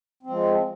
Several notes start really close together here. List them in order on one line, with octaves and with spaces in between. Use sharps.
C4 F3 G#3